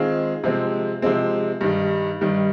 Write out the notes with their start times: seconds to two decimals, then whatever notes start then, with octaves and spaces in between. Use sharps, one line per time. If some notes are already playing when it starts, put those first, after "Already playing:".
Already playing: D#3 G#3 C4 F4 G#4
0.44 C3 F3 G#3 C4
1.02 C3 F3 G#3 C4
1.61 G2 D#3 G3
2.21 G2 D#3 G3